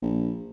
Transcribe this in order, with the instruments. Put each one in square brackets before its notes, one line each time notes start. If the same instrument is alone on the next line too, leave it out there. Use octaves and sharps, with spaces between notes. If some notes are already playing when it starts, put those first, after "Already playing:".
[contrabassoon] A#1